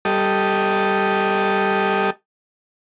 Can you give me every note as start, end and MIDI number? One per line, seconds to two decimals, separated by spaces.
0.05 2.10 55
0.05 2.10 67
0.05 2.10 69
0.05 2.10 75